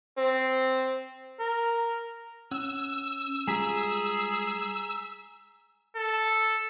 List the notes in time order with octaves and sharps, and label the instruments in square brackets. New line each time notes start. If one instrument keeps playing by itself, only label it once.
[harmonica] C4
[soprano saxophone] A#4
[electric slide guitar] C#4 F#5 [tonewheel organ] E6
[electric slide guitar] G3 G#3 F4 [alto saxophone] G#4 [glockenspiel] G#5 A#5 B6
[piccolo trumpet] A4